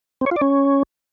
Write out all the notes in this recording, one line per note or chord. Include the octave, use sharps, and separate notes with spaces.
C4
C#5
F4
D5
C#4